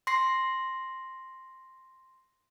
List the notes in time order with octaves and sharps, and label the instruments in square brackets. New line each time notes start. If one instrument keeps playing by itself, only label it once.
[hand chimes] C6 A#6 C7